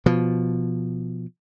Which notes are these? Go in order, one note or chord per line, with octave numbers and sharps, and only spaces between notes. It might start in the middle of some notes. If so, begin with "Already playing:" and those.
B2 F3